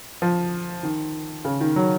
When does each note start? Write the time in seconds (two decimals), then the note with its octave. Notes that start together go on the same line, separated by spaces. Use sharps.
0.22 F3
0.83 D#3
1.45 C#3
1.60 D#3
1.76 F#3